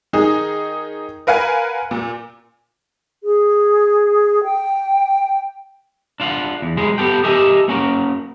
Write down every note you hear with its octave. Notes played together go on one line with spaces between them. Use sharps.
D#3 D#4 G#4
A#4 B4 F5 F#5 G#5
A#2
G#4
G5
D4 F4 F5 F#5
E2
F#3 G#3 B3 G#4
B3 G4 A4 F#5 G5
G4 A#4 D#5 E5 G#5 A5
A#3 C#4 F#4 A#4